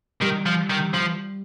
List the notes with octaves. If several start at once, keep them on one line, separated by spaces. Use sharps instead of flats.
D#3 G3
F3
D#3
F3